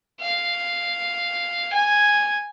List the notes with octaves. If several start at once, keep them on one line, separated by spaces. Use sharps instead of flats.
F5
G#5